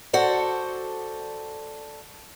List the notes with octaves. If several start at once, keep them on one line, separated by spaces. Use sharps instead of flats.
F#4 A4 C5 D5